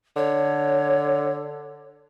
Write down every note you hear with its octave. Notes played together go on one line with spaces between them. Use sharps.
D3 C#5